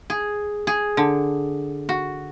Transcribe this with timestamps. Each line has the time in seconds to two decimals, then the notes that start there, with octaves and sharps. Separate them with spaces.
0.10 G#4
0.67 G#4
0.97 D3
1.89 F#4